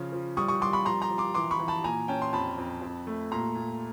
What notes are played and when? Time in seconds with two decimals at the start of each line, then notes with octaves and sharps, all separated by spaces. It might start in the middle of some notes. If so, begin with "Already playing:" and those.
Already playing: C#3 F3 C#4
0.12 F3
0.37 G3 C#6 D#6
0.48 C#6 D#6
0.61 G3 C6 D6
0.73 B5 C#6
0.85 F3 A#5 C6
1.02 A#5 C6
1.11 F3
1.18 C6 D6
1.34 E3 C6 D6
1.51 B5 C#6
1.59 E3
1.68 A5 B5
1.84 A#2 G#5 A#5
2.08 C#4 G5 A5
2.22 C6
2.33 F2 A5 B5
2.58 F2
2.82 F2
3.07 A3
3.31 A#2 A#5 C6
3.55 A#2